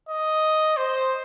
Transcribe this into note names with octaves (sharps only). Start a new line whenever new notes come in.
D#5
C5